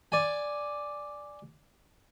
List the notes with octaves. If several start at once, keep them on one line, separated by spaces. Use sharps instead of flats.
D5 G#5